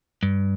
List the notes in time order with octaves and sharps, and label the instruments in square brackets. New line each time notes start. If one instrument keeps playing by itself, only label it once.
[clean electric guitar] G2